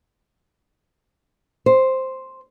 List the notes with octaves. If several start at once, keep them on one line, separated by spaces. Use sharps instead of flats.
C5